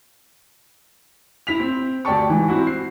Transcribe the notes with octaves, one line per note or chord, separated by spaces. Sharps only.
E4 B6 F7
C4
D2 G4 D5 G5 A5 C#6
G#2 E3
C4 E4 F#4
C7